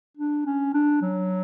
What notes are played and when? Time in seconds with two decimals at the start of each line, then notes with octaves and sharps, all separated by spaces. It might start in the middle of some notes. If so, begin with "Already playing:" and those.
0.17 D4
0.46 C#4
0.74 D4
1.02 F#3